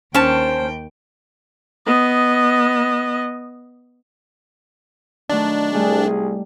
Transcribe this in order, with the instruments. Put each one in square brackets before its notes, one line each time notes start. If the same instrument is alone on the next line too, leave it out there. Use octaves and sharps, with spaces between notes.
[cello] D#2 G5 [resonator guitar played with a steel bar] C#4 A5 [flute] C5
[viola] B3 D#5
[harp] D#3 F#3 A3 [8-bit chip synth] D4
[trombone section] C2 G#4 [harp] G3 A3